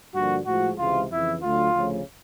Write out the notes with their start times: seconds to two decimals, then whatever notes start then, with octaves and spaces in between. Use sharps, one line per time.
0.14 G2 D3 F3 A#3 F#4
0.46 A2 F3 G#3 F#4
0.78 C#2 C3 E3 G#3 F4
1.10 F2 C#3 E3 E4
1.43 D2 D3 F#3 A3 F4
1.75 D2 C#3 F3 A3